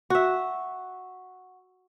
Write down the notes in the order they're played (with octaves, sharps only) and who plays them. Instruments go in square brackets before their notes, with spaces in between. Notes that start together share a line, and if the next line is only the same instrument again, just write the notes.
[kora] F#4 E5